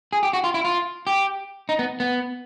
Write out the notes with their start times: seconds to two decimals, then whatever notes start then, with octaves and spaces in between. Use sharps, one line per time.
0.13 G#4
0.23 G4
0.33 F#4
0.44 F4
0.54 E4
0.65 F4
1.07 G4
1.69 D#4
1.79 B3
2.00 B3